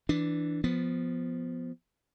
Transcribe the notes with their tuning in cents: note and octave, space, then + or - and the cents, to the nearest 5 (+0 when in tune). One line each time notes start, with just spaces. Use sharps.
E3 +0 D4 +0
F3 +0 B3 +0